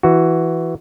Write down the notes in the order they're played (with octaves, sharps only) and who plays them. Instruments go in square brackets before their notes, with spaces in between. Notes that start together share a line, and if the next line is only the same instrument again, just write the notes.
[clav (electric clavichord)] E3 F#4